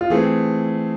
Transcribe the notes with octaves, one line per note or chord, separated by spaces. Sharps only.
F4
E3 A3 C4 G#4